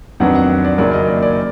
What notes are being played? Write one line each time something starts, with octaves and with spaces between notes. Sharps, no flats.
F2 D#3 F#3 B3 D4 F#5
F#5
F#5
D5
F#1 F#2 D#3 F#3 A#3 D5
D#5
D5
D5